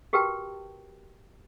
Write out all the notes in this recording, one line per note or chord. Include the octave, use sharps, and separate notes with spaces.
F#4 G4 A#4 B4 G5 A5